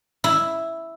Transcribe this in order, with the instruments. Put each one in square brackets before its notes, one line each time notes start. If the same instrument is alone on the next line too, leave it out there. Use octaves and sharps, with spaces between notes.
[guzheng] E4